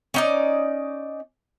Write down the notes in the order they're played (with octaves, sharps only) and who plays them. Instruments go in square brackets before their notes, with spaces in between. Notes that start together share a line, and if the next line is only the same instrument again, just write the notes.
[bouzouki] C#4 D#4 D5